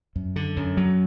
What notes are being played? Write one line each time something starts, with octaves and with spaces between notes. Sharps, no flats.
F#2
D3
F#2
F#3